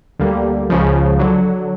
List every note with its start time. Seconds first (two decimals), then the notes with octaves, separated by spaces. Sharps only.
0.19 D2 D3 G3 A#3
0.70 C#2 C#3 F3
1.19 D3 F#3